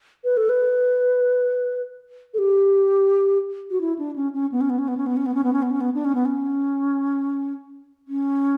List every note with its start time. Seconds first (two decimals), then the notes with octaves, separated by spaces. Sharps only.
0.24 B4
0.37 A4
0.49 B4
2.34 A4
2.38 G4
3.71 F#4
3.81 E4
3.99 D4
4.16 C#4
4.34 C#4
4.52 B3
4.61 C#4
4.70 B3
4.79 C#4
4.88 B3
4.97 C#4
5.06 B3
5.17 C#4
5.26 B3
5.35 C#4
5.44 B3
5.53 C#4
5.62 B3
5.71 C#4
5.81 B3
5.94 D4
6.05 C#4
6.15 B3
6.25 C#4
8.08 C#4